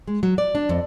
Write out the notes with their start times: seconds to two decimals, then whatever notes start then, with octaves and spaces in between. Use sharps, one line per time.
0.08 G#3
0.23 F#3
0.38 D5
0.55 D4
0.69 F2